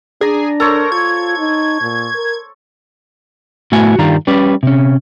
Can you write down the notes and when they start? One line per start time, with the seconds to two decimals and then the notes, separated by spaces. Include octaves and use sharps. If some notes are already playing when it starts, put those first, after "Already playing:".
0.21 D4 G#4 D5 A#5
0.60 A4 A#4 C5 C#5
0.92 F4 G#6
1.38 D#4
1.82 A#2
2.14 A#4
3.72 A2 A3 B3 F#4 G#5
3.99 G2 D#3 G3 F4 A#5
4.27 G3 C#4 B4 D5
4.63 C3 C#4